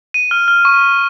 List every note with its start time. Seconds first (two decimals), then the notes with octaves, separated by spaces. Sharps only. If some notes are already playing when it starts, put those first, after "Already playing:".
0.14 D#7
0.31 F6
0.48 F6
0.65 C#6